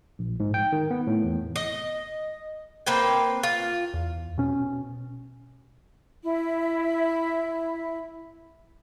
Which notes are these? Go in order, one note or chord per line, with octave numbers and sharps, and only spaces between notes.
A#1
G#2
G5
D#3
B3
A2
E2
D#5
A#3 C4 B4 G5
F4
E2
B2 C#4
E4 E5